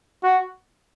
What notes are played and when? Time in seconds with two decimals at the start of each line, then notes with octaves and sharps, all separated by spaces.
0.23 F#4